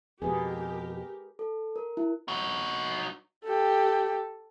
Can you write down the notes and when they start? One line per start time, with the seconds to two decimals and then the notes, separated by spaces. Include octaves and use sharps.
0.22 F2 B2 G4 G#4 A#4 B4
1.39 A4
1.76 A#4
1.97 E4
2.28 D#4 F#4
3.45 G4 A4